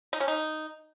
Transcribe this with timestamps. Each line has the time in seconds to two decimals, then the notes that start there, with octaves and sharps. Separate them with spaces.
0.13 D#4
0.20 C#4
0.28 D#4